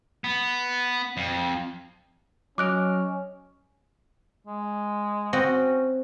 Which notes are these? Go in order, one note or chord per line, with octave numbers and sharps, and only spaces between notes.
B3
F2
F#3 C#4 D#5 D6 F6 F#6 D7
G#3
C4 C#4 F#4 D#5